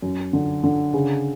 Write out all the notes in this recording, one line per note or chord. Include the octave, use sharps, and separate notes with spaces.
F#2
D3
D3
C#3